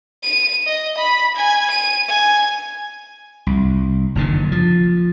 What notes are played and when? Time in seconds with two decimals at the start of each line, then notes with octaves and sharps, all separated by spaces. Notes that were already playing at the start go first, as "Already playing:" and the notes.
0.23 D#7
0.67 D#5
0.98 B5
1.36 G#5
1.71 D#7
2.09 G#5
3.47 C2
4.15 F#1 A#2 D3 D#3
4.52 F3